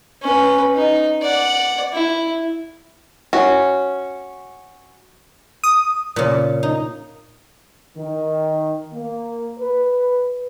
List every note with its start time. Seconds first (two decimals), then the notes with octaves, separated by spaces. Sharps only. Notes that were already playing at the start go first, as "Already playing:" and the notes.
0.22 C#4 B4
0.75 D#4
1.22 D5 F#5
1.93 E4
3.33 C#4 F#4
5.64 D#6
6.16 A#2 C#3
6.63 D#4
7.97 D#3
8.93 A#3
9.58 B4